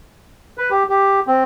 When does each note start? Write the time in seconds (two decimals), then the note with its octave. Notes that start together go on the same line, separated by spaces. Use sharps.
0.58 B4
0.70 G4
0.89 G4
1.27 C4